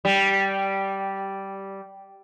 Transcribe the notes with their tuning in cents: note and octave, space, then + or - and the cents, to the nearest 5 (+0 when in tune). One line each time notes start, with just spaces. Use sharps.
G3 -10